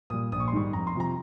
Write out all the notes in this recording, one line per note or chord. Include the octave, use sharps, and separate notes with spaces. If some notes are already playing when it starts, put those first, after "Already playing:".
A#2 G3 D#6
A#1 D#6
C#6
C6
G#2 D#3 G3 C#6
F2 A#5
C6
C3 F3 A#5